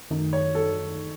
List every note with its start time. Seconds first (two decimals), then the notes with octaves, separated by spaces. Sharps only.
0.11 F#2 D#3 A3 D#4
0.33 C#5
0.55 A4